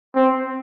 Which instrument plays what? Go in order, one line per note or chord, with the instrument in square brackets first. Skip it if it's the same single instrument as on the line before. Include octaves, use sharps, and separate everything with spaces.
[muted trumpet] C4